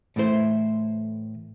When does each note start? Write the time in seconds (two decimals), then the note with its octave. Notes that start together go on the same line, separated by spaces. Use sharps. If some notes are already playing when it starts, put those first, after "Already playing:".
0.16 A2 E3 A3 E4 C5